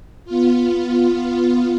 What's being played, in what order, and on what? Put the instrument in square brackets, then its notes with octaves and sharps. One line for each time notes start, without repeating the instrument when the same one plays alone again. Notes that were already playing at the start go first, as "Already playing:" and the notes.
[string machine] B3 F4